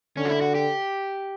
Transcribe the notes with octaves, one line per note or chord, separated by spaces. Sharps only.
D3 C#4
F#4
E4
F#4
G4